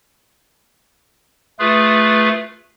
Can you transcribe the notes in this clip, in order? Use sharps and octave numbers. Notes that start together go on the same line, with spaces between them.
A3 F4 G#4 B4